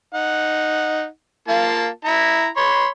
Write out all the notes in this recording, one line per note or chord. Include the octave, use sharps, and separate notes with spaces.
D#4 F#5
A#3 F4 A5
E4 A#5
C#5 B5 C6